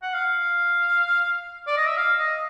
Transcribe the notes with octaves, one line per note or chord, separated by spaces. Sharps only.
F#5
F5
D5
D#5
E5
F5
D#5